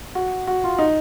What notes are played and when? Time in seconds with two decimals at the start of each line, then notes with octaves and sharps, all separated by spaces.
0.15 F#4
0.47 F#4
0.64 F4
0.79 D#4